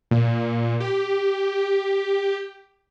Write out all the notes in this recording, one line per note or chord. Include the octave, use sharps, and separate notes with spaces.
A#2
G4